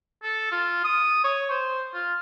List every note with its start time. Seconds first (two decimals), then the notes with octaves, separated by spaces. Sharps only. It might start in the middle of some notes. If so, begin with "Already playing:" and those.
0.23 A4
0.52 F4
0.85 D#6
1.24 C#5
1.50 C5
1.94 F4